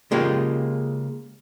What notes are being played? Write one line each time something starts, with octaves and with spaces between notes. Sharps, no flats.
C#3 G#3 A#3 F4 G4